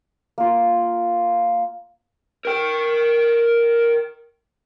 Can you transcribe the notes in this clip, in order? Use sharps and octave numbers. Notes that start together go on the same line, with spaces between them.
A#3 F4
A#4 G5